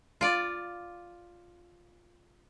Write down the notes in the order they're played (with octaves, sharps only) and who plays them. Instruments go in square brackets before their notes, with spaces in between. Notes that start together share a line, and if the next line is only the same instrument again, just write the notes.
[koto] F4 D5